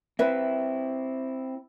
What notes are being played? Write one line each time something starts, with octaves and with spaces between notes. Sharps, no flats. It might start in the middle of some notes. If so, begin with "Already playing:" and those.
C4 E4 B4 E5